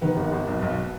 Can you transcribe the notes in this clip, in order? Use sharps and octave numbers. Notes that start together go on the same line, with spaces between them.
D#3 B3 B4
G#1
G#1
B1
B1